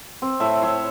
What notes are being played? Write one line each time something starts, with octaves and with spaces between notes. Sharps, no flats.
C4
A2 E5
C5 C#5 E5